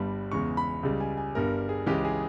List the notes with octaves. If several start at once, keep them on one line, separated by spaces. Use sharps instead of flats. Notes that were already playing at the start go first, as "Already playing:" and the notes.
Already playing: G1 G2 G3 B5
E2 C#3 G#3 C#6
B5
C#2 C#3 G3
G#5
G#5
G1 G2 G3 A#4
G#4
C#2 C#3 E3 G#3 G4
G#4